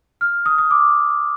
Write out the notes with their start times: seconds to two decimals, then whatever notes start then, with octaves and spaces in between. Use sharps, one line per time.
0.21 F6
0.46 D#6
0.58 D#6
0.71 D6